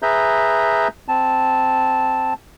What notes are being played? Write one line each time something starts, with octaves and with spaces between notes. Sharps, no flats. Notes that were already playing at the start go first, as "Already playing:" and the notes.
G#4 B4 E5 A#5 G6
C4 A5